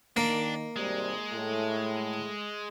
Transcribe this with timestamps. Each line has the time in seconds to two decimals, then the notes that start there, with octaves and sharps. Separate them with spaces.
0.17 D#3 A#3 D4
0.76 G#1 C3 G3 G#3
1.32 A2